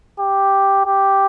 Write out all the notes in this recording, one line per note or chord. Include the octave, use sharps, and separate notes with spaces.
G4
G4